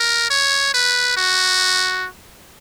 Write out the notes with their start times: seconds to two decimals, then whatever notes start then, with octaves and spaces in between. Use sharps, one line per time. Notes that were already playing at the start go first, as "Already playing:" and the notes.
Already playing: A#4
0.30 C#5
0.74 B4
1.17 F#4